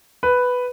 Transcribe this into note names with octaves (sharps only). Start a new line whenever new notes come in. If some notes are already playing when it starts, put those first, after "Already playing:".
B4